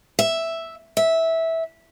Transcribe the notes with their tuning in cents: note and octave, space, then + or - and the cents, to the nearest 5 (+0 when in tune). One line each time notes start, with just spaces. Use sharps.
E5 +0
E5 -15